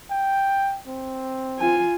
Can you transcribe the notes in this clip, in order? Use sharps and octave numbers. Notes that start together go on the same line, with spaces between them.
G5
C4
F4 G#5